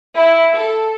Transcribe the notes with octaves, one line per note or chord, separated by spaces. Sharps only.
E4
A4